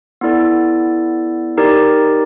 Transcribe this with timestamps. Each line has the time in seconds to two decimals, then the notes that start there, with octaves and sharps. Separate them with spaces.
0.21 B3 E4 A4 D5
1.57 D#4 G4 A#4 D5